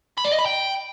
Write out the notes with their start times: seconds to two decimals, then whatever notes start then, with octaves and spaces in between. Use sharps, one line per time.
0.18 B5
0.25 D5
0.32 D#5
0.39 B5
0.46 G5